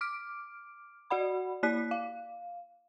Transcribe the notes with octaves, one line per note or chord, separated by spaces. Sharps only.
D6 F6 D7
F#4 D5 F#5 B5
A#3 E4 D5 F#6 B6
F5